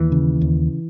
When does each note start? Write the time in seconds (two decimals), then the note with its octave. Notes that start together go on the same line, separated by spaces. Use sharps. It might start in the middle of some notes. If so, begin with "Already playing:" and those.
Already playing: D#2 E3
0.12 C#3
0.41 D#2